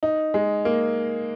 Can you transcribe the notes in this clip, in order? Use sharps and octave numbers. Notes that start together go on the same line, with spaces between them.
D#4
G#3
A#3